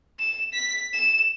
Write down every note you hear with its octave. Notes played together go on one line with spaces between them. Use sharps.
E7
B6
E7